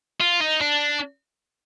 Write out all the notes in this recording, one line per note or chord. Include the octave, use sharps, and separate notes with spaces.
F4
D#4
D4